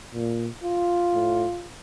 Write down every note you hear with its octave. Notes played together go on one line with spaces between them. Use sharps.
A#2
F4
A2